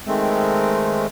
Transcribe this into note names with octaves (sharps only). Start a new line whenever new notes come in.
D#3 G#3 A3 C4